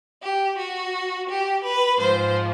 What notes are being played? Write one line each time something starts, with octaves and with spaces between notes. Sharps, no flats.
G4
F#4
G4
B4
G#2 F3 C5